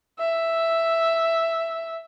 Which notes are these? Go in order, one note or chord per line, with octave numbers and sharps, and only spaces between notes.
E5